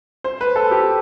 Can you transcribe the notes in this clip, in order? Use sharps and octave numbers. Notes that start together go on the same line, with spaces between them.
C5
B4
A4
G4